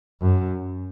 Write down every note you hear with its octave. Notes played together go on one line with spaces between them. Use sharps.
F#2